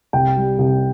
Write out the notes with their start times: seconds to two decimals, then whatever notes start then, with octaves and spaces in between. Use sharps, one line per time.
0.13 C2 G5
0.37 G3
0.59 C2